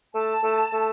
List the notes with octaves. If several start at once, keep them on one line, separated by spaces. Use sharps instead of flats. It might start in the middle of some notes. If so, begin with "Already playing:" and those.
A3 A5
A3
A3